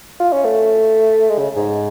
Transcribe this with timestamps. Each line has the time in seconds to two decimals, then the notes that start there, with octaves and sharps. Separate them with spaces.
0.20 F4
0.32 C#4
0.45 A3
1.29 G#3
1.38 C#3
1.56 G#2